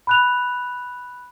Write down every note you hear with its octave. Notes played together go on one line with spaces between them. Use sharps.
B5 F#6 F7